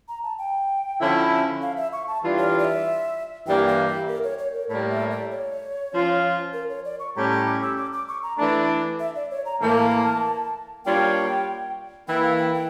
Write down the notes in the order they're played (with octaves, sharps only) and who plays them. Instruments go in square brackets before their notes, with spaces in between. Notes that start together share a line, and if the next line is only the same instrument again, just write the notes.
[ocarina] A#5
A5
G5
[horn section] D3 F3 C#4 E4
[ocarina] F5
E5
C#6
A5
[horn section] E3 G3 D4 F4
[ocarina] C#5
D5
D5
E5
[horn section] G2 E3 G3 A#3 [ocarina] G5
[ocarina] F5
E5
A#4
C#5
C#5
A#4
[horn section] A2 G3 A#3 [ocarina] C#5
[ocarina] E5
D5
C#5
[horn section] F3 C#4 F4
[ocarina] A#4
C#5
D5
C#6
[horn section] A2 G3 C#4 G4 [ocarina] A#5
[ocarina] A#5
D6
E6
D6
D6
C#6
A#5
[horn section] E3 A3 D4 [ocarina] A5
[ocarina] E5
D5
C#5
A#5
[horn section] A2 E3 A#3 [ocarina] A5
[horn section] G3 A#3 D4 F4 C#5 [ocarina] G5
[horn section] E3 A#3 E4 [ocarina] G5
[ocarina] F5
G5
G5